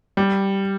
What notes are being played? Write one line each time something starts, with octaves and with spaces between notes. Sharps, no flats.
G3